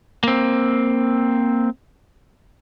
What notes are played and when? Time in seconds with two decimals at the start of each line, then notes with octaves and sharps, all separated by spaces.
0.23 A#3 C4